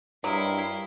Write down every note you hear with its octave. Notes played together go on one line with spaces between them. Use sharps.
G2 F#3 E4 A#4 D#5 C6